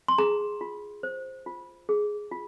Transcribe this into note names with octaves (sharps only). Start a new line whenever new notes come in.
C6
G#4 A#5
F4
C5
F4
G#4
F4